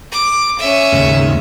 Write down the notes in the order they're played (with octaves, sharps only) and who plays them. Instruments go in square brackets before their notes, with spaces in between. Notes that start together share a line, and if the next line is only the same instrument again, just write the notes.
[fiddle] D6
C#4 E5
[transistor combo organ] D#2 G#2 C#3